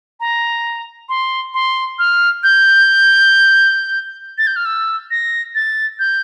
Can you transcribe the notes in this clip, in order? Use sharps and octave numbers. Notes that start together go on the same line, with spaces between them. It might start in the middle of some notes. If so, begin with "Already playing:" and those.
A#5
C6
C6
F6
G6
A6
G6
F6
E6
A#6
A6
G6